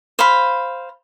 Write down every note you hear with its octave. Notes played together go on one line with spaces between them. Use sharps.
C5 F5 B5